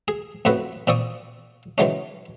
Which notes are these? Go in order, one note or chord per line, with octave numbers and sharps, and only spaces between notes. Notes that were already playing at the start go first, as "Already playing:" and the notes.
G#4
F2 A2 C4 F#4 B4
A#2 C4 D5 C#6 D#6
D#3 E3 F#3 G#3 C#4